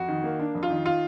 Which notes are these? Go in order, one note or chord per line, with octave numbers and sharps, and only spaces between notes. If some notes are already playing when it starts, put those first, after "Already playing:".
Already playing: F2 F#4
D#3
A#3
D4
F2
F4
D#3
F4